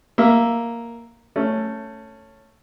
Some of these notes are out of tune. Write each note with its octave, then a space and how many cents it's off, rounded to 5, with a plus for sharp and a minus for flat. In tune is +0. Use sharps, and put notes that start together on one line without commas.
A#3 +0 E5 +0
A3 +10 C#4 +0